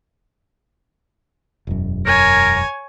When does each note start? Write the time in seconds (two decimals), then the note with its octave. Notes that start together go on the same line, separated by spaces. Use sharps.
1.67 E1 F#2
2.06 A#4 C#5 G#5